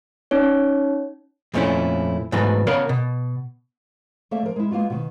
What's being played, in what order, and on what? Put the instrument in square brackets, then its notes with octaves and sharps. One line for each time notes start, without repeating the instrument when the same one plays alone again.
[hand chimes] C#4 D#4 C#5
[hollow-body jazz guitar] F2 A#2 A3 C4 C#4 E4
G#2 E3 F#3 A3 B3 F#4
C#3 B3 A#4 C#5 F5 B5
B2
[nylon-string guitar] A3 A#3 A4 D5 E5
F3 A#4
G#3 E4
G#3 A#3 B3 F4 F#4
B2 D#3